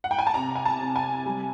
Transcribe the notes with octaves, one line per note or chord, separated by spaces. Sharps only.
F#5
G5
G#5
A5
C3 A#5
G#5
A5
C3
G#5
G3